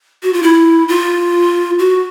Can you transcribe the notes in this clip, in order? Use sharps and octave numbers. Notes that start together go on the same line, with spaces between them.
F#4
F4
E4
F4
F#4